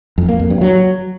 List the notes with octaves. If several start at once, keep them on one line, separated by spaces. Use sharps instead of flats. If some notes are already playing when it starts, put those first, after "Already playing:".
F2
A#3
F2
G2
F#3